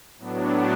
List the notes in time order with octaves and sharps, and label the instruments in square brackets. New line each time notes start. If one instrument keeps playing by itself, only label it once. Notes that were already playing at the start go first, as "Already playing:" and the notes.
[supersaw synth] A2 F#3 B3 D4